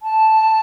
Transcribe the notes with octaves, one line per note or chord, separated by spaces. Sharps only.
A5